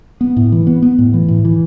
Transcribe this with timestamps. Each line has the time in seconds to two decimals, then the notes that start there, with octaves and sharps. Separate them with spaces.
0.21 B3
0.37 A2
0.52 E3
0.67 B3
0.82 B3
0.99 A2
1.14 E3
1.28 A2
1.45 E3